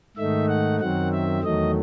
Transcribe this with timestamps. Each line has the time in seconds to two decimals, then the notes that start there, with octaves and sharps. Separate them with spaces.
0.17 G#2 D#3 A3 D#4 E5
0.48 F#5
0.80 F#2 D#3 F#3 C4 F#5
1.12 E5
1.43 E2 D#3 F#3 A3 D#5